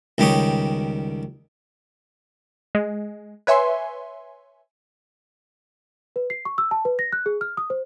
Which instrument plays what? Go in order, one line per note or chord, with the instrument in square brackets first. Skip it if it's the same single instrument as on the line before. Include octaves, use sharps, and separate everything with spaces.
[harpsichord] C#2 D#3 G3 G4 C#5 D#6
[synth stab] G#3
B4 C#5 E5 G#5 C6
[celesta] B4
C7
C#6
E6
A5
B4
A#6
F#6
G#4
F6
D#6
C5